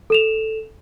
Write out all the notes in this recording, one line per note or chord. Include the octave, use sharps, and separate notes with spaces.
A4 E7 F7